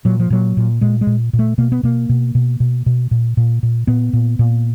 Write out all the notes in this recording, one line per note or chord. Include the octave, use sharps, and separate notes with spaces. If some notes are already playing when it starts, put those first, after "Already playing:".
A#2 F#3
F3
A#2 F#3
A#2
A#2 G#3
G#3
A#2
A#2
A3
B2 A#3
B3
B2 A#3
B2
B2
B2
B2
A#2
A#2
A#2
A#2 B3
A#2
A#2